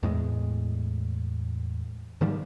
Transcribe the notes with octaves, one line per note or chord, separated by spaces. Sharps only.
E2 A2 G#3
G#2 D#3 F3 G3